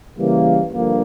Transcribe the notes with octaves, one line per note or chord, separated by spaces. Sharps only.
C#3 E3 G3 A#3
G2 D3 F3 A#3